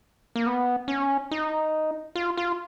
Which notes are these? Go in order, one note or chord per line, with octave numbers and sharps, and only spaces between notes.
A#3
B3
C#4
D#4
F4
F4